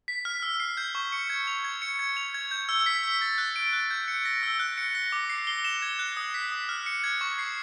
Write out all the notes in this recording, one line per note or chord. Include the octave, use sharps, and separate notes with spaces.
B6
F6
E6
C7
G6
C#6
C#7
G#6
F7
G#6
C#7
G#6
F7
G#6
G6
E6
B6
E6
A6
F#6
D7
F#6
G6
C#7
A#6
E6
F#6
C#7
A#6
D6
C7
G7
E7
G#6
F#6
D#6
B6
D#6
F6
C#7
G#6
C#6
C7